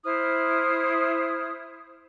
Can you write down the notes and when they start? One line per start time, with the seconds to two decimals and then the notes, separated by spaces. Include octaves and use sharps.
0.04 E4 C5 D#6 F6